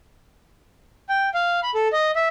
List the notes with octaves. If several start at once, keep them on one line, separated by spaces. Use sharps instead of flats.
G5
F5
B5
A4
D#5
E5